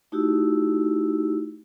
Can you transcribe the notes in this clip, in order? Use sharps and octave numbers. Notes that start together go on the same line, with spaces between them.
A3 D#4 E4 F#4 G4 E6